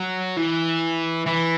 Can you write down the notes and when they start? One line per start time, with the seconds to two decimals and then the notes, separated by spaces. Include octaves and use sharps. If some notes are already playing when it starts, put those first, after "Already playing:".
Already playing: F#3
0.37 E3
1.27 E3